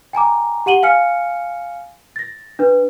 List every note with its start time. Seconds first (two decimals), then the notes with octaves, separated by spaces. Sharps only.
0.13 G5 G#5 A#5 D6
0.66 G4 F#5 D#7 F#7 G7
0.83 F5 G#5 F6 C#7
2.16 A6 A#6
2.59 D4 B4